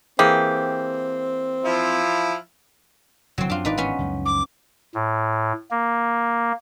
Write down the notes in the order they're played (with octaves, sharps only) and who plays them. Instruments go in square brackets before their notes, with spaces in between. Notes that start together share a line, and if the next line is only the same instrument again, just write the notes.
[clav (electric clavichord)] E3 A#3 G#4 [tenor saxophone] C4 [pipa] G4
[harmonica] F3 E4 F4
[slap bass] F1 D3 E3 [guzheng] F#3 C4
[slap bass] F#2 F3 [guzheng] D4 F4
[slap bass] G#1 E3 [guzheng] D#4 B4 D5
[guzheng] B3 C#4
[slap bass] C#2 F#2 F3
[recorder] D6
[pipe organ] A2
A#3